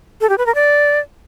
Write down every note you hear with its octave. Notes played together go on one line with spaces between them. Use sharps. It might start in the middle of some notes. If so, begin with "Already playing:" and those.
A4
G4
B4
A#4
D5